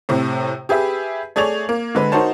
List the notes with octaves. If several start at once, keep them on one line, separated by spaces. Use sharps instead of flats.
A2 C3
G4 G#4 B4 E5
A3 G#4 C#5 D5 G#6 F7
A#3
D3 G#3 B4
D#4 F#4 A#4 C5 C#5 A5